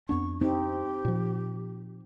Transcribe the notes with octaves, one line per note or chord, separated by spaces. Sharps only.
F2 B3 D4 C#6
C4 D#4 G4
A#2 F3